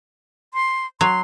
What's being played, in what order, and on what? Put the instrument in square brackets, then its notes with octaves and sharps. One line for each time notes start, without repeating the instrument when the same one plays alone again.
[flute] C6
[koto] F#3 [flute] C6